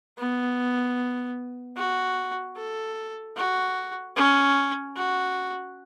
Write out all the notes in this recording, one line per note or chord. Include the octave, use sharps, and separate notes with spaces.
B3
F#4
A4
F#4
C#4
F#4